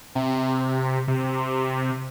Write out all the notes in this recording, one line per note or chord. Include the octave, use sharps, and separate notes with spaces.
C3
C3